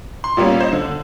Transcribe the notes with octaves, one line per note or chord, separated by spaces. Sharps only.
C6
A#2 G3 A#3 B3 C#4
C5 D#5
D3